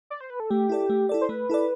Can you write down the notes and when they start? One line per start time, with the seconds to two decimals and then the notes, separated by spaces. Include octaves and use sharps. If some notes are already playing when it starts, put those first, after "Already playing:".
0.10 D5
0.21 C5
0.30 B4
0.40 A4
0.50 A3 G4
0.69 E4 A4 D5
0.90 A3
1.09 E4 A4 D5
1.21 C5
1.29 A3 B4
1.50 E4 A4 D5